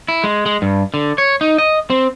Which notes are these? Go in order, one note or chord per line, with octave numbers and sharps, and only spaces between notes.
E4
G#3
G#3
G2
D3
C#5
D#4
D#5
C4